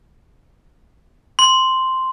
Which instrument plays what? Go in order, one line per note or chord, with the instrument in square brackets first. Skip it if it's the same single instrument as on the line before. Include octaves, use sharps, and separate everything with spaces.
[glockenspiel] C6